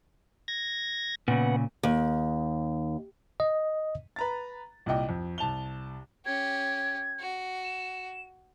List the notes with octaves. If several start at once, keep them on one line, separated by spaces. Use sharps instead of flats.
G#6 A#6
A#2 C#3 B3 F#5
D#2
D#5
B4 A#5 A6
C2 A#2 D#5 G5
F2
C2 A5 F7 G7
C#4 G4 G#6
F#4
E7